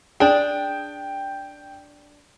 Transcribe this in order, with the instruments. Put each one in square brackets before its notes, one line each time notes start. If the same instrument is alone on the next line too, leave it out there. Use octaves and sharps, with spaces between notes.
[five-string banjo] D4 G#4 [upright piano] G5